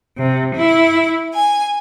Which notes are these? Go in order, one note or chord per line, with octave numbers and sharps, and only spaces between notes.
C3
E4
G#5